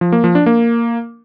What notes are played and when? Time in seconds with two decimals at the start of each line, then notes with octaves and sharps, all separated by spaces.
0.01 F3
0.12 A#3
0.24 F3
0.35 D4
0.46 A#3